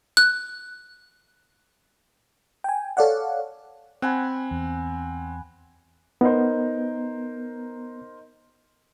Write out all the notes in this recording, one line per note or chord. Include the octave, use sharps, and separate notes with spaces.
F#6
G5 G#5
A4 C#5 D5 F5 F#5
C4 F#5 G#5 B5
E2
B3 D#4 A#4 C5